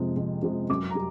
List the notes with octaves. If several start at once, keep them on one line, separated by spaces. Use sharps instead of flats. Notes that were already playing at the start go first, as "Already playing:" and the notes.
Already playing: F2 C3 F3 G#3
F2
C3 F3 G#3
F#2 D6
A#5
G3